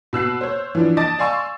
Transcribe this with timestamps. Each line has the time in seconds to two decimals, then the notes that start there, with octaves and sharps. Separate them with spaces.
0.13 B2 E6 F#6 C7
0.41 C5 C#5
0.75 E3 F3 D4
0.97 D#5 A5 D6 A6
1.19 D5 F5 G#5 C6 C#6 E6